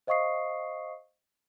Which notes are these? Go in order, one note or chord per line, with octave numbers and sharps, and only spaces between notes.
C5 D#5 F5 C#6 D#6 C7